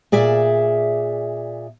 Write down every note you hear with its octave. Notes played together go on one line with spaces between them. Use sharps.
A#2 G#4 D5 E5